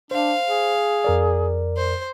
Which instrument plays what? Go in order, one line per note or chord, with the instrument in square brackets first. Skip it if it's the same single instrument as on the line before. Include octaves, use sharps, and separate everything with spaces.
[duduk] D4 [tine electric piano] C5 [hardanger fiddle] F5
[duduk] G#4
[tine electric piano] F2 A#4 D5
[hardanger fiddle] C5